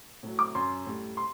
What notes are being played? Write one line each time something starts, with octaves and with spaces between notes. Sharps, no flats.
A2 F#3
D6
F#2 F#3 C6
A2 G3
C6